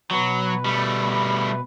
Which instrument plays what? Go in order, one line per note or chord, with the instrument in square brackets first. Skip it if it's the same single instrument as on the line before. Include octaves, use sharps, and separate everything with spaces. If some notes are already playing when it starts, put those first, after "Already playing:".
[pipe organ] B2 B4 [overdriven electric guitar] F#3
[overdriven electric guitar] G3 A3